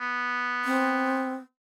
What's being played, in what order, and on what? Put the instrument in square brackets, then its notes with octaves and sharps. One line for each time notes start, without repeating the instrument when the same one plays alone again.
[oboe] B3
[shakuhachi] C4